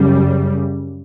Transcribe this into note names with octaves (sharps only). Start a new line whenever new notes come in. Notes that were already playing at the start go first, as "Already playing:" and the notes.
Already playing: F#2 C#3 G3